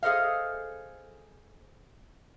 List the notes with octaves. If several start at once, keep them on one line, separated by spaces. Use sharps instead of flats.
G#4 A4 C5 D#5 F5